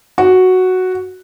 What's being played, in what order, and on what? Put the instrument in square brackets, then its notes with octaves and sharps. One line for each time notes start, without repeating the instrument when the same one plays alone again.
[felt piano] F#4